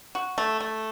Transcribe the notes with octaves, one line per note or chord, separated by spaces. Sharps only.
F#4
A3
A3